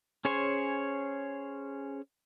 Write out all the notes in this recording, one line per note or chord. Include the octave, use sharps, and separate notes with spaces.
C#4 G#4 C5 C#5 G#5